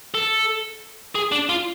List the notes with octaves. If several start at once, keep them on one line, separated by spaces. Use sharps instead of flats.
A4
G#4
D4
F4